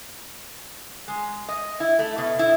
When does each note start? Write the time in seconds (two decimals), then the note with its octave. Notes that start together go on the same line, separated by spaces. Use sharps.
1.08 G#3
1.49 D#5
1.80 E4
1.99 A3
2.18 B2
2.39 E4